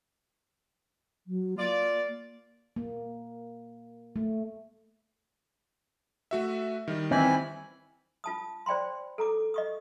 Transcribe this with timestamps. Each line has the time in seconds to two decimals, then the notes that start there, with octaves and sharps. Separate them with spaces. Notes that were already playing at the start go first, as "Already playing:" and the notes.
1.27 F#3
1.58 A#3 F4 D5
2.76 A#3
4.16 A3
6.31 A3 F#4 E5
6.88 D#3 G3 D#4
7.11 E3 C4 E4 G#5 B5
8.24 F4 A5 D#6
8.66 C5 D5 G5 B5 C6
9.18 A4 A#5 D6
9.54 D#5 C#6 D#6